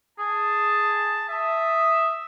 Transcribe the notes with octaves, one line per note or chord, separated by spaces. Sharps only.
G#4 A5
E5 D#6